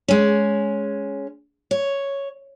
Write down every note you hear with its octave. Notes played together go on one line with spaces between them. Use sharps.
G#3 C#4
C#5